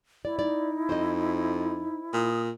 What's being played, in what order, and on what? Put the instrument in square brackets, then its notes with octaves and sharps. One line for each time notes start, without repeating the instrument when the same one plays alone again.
[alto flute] E4 [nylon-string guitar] D5
[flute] D#4 [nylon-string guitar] D5
[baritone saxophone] F2 [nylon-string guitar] C5 D#5
[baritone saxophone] A#2 [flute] D#6